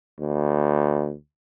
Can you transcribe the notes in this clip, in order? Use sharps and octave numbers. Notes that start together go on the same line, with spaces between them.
D2